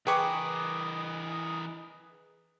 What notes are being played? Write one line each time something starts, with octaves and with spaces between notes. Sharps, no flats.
E3 G#4 A#4 B4 D#5 G5 C#6 D6